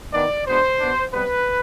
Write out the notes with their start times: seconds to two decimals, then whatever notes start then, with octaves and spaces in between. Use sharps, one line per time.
0.13 D#3 B3 D4 D5
0.46 B2 G#3 B3 D4 C5
0.80 B2 B3 D4
1.13 C3 G3 B3 B4